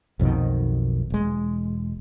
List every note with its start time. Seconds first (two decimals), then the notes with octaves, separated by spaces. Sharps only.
0.19 B1 F2 B2 D#3
1.10 E1 G#3